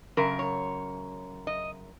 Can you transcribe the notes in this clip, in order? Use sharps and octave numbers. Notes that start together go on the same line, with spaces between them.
F#2 C#3 A#4
C#5
D#5